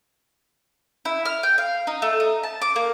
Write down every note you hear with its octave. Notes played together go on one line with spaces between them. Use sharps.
E4
F6
G5
F5
D#4
A3
D#4
A5
D6
A#3